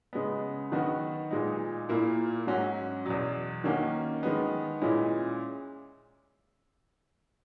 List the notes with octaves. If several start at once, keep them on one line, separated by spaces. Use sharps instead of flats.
C#3 G#3 B3
D#3 F#3 B3 F#4
A#2 G#3 D#4
A#2 A#3 E4
G#2 F#3 C#4 F#4
E2 B2 F#3
D#3 A#3 C#4 F#4
D#3 G#3 B3
A#2 G#3 C#4 E4